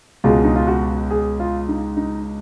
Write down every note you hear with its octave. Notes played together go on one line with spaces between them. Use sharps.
C#2 B2 G#3 F4
D#4
F4
F#4
G#4
F4
D#4
D#4